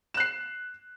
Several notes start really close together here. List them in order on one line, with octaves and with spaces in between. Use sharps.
E7 F#6 C7